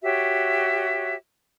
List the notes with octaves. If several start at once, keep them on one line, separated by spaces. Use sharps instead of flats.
F#4 G4 C#5 E5